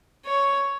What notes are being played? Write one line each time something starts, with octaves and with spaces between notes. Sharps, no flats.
C#5